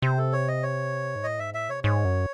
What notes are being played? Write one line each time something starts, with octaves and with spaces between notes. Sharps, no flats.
C3 C5
A4
C#5
D#5
C#5
G#2
A2 D#5
G#2 E5
A2 E5
C3 C#5
G#2 C#5
F#2